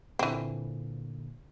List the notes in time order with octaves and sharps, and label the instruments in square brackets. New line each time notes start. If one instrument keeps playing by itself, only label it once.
[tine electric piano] A#2 D3 A#3 [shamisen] E3 C4